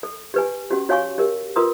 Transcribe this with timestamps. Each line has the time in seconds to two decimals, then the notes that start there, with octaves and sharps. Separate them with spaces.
0.03 A4
0.34 G4 B4 G#5
0.71 C#4 F#4 G4
0.89 F#4 C#5 F5 G#5 C#6
1.18 G4 A#4
1.56 F4 A#4 B4 C6 D#6